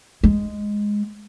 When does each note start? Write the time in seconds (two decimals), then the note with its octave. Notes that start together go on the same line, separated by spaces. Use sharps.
0.24 G#3